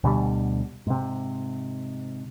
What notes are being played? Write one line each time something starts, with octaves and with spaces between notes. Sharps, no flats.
D2 B2 D3 G3
G#2 C3